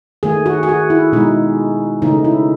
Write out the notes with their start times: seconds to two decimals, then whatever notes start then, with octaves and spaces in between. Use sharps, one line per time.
0.23 D#3 A3 G#4
0.46 F#4
0.63 G#4
0.69 F#4
0.90 E4
1.12 B2 G#3 D#4
2.02 C#3 E3 A3 D#4
2.25 E4